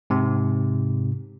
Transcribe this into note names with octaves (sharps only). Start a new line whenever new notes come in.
G#2 C3